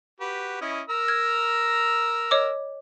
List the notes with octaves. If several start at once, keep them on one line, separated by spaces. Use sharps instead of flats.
F#4 G4 B4
C#4 E4 D#5
A#4 A#5 E6
F6 G#6
C#5 D#5 D6